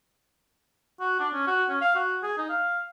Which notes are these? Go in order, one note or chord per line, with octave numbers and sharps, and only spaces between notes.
F#4
D4
C#4
F#4
C#4
F5
F#4
G#4
D#4
F5